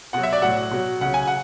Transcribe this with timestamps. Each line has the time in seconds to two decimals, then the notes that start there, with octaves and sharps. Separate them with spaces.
0.13 B2 F#3 F#5
0.23 E5
0.33 D5
0.42 A2 F#3 F#5
0.71 B2 F#3
1.01 C#3 F#3 F#5
1.14 G#5
1.27 F#5